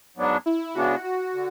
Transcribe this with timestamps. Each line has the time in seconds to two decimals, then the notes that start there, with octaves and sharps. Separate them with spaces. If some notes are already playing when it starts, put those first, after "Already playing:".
0.16 G#2 F#3 B3 D4
0.46 E4
0.75 C#3 G#3 B3 D4 F#4
1.04 F#4
1.33 D3